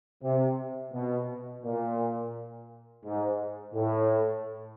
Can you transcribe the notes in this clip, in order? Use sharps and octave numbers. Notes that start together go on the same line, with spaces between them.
C3
B2
A#2
G#2
A2